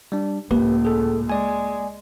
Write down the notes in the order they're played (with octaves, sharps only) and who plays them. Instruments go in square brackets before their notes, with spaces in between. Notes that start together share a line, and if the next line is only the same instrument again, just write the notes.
[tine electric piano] G3 D4
[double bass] C#2 A2 [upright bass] A#3 [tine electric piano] G4 B4
[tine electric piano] G#4 A4
[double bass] G#3 [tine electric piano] D5 G#5